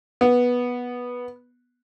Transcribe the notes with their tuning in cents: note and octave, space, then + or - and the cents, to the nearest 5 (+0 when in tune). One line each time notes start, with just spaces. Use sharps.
B3 -10